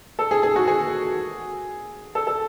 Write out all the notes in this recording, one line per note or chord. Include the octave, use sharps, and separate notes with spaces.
A4
G#4
G#4
F#4
G#4
A4
A4